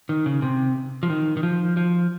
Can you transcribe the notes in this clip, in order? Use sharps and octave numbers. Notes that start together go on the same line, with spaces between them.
D#3
C#3
C3
F3
D#3
D#3
F3
F3